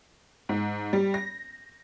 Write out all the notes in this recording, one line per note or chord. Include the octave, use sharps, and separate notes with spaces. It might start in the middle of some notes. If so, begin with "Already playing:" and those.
G#2
G3
A#6